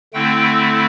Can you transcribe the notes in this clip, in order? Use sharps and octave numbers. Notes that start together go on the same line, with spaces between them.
D3 A3 C4 E4 G5